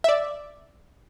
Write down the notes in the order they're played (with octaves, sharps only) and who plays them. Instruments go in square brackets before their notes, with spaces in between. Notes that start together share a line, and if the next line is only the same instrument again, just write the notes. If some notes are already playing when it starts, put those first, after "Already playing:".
[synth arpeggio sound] D5 E5